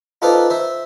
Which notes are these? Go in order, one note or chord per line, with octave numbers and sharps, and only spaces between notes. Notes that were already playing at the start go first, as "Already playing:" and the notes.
D#4 F4 A4 B4 C5 D5
C5 E5